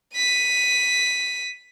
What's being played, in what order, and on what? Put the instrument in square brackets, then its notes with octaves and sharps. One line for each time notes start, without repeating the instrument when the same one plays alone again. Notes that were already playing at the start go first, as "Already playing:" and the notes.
[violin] B6 D#7